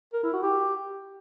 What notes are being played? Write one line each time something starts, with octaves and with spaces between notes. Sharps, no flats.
A#4
E4
F#4
G4